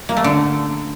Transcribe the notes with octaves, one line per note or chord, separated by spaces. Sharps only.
A#3
A3
D3